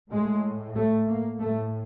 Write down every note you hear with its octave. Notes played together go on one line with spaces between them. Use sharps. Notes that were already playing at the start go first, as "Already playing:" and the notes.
A2 G#3
A3
A#3
A2 A3